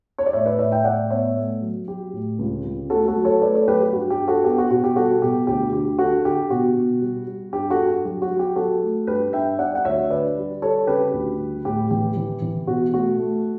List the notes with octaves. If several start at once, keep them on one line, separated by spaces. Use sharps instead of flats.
C#5
D5
A2 C#5 E5
B4 D5
A2 C#5 E5
E5 G5
A2 D5 F#5
B3 C#5 E5
A3
F#3
F#3 G4
A2
C#2
C#2
A3 F#4 A4
F#4 A4
F#3
A4 C#5
A3 B4 D5
A4 C#5
F#3 G4 B4
G4
G2 F#4
G4
G2
F#4 A4
B3 G4
F#4
B2 F#4
G4
G3 F#4 A4
B2 G4
D2 G4
D3 G4
D3 F#4 A4
D3 G4
B2 F#4
B2
G3
G3
G2 G4
F#4 A4
G2
F#3 G4
F#4
F#3
G4
F#3 F#4 A4
A3
G2 G4 B4
G2 E5 G5
G3 D5 F#5
F#5
D2 C#5 E5
D3 B4 D5
G3
G3 A4 C#5
C#3 G4 B4
D2
G3
A2 G4
E3 G4
E3
E3
B2 F#4
A3 F#4
A3